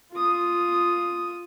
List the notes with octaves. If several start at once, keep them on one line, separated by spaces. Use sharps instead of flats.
F4 D#6